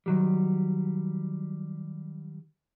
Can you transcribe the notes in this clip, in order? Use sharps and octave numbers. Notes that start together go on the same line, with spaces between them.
D#3 F#3 G3